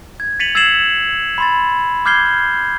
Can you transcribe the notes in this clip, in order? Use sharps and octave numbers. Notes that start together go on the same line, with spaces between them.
G#6
A6 B6 C#7 D#7 F7 F#7
E6 G#6 A6 C7 E7 F#7
B5 C6 A6
D6 F6 G6 G#6 C7 G7